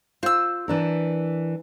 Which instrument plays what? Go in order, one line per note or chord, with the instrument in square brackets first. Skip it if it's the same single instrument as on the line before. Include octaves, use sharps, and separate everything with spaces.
[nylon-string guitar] F4 [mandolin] C5 E6
[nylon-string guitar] E3 D4 A#4